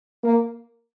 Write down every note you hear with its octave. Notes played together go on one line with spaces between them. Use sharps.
A#3